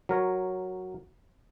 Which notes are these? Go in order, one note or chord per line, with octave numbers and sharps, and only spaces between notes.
F#3 A#4 C#5